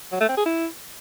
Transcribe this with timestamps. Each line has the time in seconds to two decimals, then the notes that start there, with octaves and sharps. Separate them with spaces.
0.12 F#3
0.20 A3
0.29 C4
0.37 G#4
0.46 E4